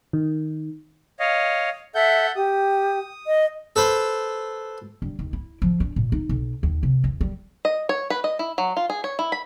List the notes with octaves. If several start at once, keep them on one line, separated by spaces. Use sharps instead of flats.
D#3
C#5 D#5 F5
A4 E5 F#5 G6
G4 D#6
D#5
A4 B4 C5
G2
D#2
E4
F3
D4
A#2
D#4
B1
D#2
C3
E2
G3
D#5
C#5
B4
D#5
E4
F#3
F4
G#4
C#5
E4
B5